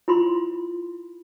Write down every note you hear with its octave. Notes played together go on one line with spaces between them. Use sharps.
E4 F4 B5 C6